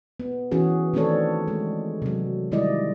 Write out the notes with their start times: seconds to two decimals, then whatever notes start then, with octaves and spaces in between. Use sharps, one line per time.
0.20 B3
0.52 E3 C#4 F#4 G#4
0.94 D#3 A3 C4 D4 A4 C#5
1.48 G#3
2.02 C3 F#3
2.52 D#3 G3 G#3 E4 D5 D#5